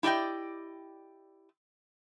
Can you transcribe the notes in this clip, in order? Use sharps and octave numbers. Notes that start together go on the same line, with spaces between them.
E4 G4 D5 D#5 G5